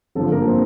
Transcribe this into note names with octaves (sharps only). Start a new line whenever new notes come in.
G1 G2 D3 F3 A4
A#3 A#4
C4 C5